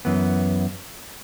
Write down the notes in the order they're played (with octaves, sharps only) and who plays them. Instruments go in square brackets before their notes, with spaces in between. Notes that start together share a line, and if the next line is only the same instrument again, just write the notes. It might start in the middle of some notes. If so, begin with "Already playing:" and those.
[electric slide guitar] F#2 E3 B3